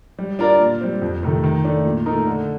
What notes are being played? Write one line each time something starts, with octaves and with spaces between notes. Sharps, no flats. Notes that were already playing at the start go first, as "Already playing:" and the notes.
G3
D4 F4 A#4 D5
A#2
G3 C4
F2
C3 D#3 A3
D#3
A3 D4
A#2
A3 D#4 A#4
D3